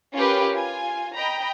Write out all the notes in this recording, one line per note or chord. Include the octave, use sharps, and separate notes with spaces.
C#4 F4 G4 A#4 B4
F4 G#5
D#5 G5 A#5 B5